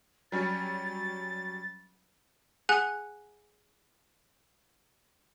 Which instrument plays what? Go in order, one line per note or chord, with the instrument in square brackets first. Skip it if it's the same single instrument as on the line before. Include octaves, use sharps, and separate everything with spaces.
[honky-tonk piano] F#3 G3 C#4 [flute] A6
[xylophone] G#4 F#5 G#5 F#6